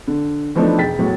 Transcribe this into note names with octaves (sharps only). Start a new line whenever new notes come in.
D3
E3 F3 A3 B3 D4 D#4
E1 G5 A6 B6
E2 A2 F#3